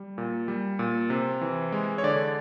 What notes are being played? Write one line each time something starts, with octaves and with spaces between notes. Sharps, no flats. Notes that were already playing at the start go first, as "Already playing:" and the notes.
Already playing: G3
A#2
G3
A#2
C3
E3
G#3
C#5
D3 D5